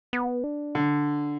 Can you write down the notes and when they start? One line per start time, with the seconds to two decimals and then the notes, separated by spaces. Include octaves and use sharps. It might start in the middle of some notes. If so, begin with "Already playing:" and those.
0.13 B3
0.44 D4
0.75 D3